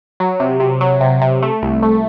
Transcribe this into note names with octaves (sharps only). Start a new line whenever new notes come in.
F#3
C3
C3
F#3
C3
C3
A3
C2
A3